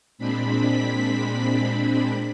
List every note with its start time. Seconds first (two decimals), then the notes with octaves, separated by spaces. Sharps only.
0.18 A#2 G#3 C4 D4 B5 B6